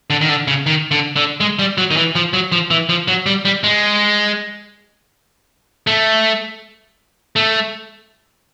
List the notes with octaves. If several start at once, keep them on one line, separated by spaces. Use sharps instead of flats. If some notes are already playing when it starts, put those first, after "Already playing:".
D3
D#3
D3
C#3
D#3
D3
D3
G#3
G3
F#3
D#3
E3
F3
F#3
F3
E3
F3
F#3
G3
G3
G#3
A3
A3